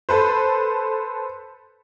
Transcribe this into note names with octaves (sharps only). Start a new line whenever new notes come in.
A4 B4 C5